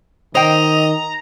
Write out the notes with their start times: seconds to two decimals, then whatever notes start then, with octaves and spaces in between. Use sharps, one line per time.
0.35 D#3 C5 D#5 G5 A#5